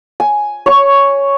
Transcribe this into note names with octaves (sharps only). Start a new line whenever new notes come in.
G#5
C#5 C#6